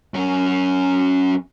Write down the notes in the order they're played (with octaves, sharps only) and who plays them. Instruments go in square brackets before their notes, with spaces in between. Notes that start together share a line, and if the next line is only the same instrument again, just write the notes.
[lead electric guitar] F#2 C#4